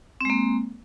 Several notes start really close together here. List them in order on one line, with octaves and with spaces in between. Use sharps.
C4 G#3 A#3